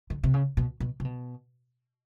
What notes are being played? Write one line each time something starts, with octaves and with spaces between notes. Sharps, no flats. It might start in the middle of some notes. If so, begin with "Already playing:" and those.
D3
C3
C#3
B2
B2
C3
B2